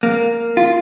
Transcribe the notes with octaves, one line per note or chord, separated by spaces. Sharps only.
A#3
F4